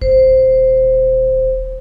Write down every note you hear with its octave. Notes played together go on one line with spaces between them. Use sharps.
D#1 C5